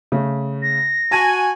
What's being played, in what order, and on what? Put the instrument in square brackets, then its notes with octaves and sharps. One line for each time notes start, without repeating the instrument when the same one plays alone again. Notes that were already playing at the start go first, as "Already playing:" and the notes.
[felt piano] C#3 A3
[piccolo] A#6
[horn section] F#4 G#5 [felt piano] A5 D#7